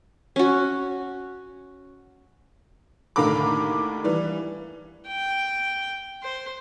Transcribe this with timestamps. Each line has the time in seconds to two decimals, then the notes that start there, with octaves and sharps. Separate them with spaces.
0.36 C#4 F#4
3.16 D#2 A2 D3 A#4 B5 D6
4.04 E3 G3
5.07 G5
6.23 C5